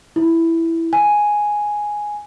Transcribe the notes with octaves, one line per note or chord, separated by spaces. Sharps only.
E4
G#5